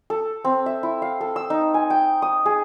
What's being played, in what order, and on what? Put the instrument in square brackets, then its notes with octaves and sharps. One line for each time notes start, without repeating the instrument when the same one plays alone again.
[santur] A4
C4
E5
E4
F5
A4
E6
D#4
G#5
G5
D#6
G#4